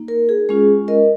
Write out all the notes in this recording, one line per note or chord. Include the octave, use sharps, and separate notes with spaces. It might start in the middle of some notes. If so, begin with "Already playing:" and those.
Already playing: A#3 D#4
A#4
G#4
G#3 C#4 F4 G#4
A#4 D#5